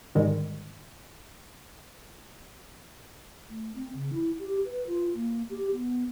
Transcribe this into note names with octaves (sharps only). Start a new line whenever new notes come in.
G#2 D3 D#3 G3 G#3
A3
C4
C#3
E4
G4
B4
F4
A#3
G4
B3